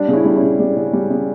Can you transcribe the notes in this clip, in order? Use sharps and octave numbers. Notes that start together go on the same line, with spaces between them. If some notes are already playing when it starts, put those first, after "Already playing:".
Already playing: G3 D4
C#3
C#4 E4
G3
C#4 E4
C#3
G3
C#3
G3
C#3